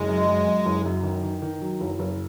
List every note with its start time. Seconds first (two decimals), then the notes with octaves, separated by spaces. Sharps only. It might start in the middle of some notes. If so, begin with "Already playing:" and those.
Already playing: F#1 G#3
0.08 F#2
0.27 F#2
0.46 F#2
0.66 F#1
0.85 F#2
1.03 D#3
1.23 D#3
1.42 D#3
1.61 F#3
1.80 F#1
1.99 F#1